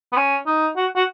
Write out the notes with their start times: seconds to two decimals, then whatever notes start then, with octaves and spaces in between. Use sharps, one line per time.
0.12 B3
0.17 C#4
0.46 D#4
0.76 F#4
0.96 F#4